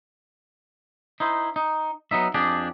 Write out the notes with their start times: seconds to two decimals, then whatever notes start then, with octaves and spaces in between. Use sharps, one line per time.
1.20 D#4 E4 C5
1.56 D#4
2.11 F#3 B3 D#4 E5
2.34 F2 D4 G4 G#4